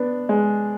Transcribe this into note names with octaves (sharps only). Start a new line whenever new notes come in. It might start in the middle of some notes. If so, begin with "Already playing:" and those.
Already playing: B3 D4
G#3